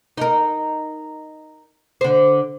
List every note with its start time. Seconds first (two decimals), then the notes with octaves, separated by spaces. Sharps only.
0.18 D#4 A#4
2.01 D3 C5